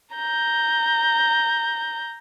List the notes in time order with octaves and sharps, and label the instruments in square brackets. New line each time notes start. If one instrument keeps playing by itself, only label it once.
[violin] A#5 G6